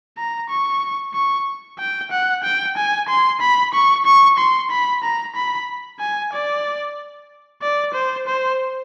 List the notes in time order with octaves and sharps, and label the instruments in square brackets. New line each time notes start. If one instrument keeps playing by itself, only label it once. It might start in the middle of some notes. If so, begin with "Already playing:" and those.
[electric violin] A#5
C#6
C#6
G5
F#5
G5
G#5
C6
B5
C#6
C#6
C6
B5
A#5
B5
G#5
D5
D5
C5
C5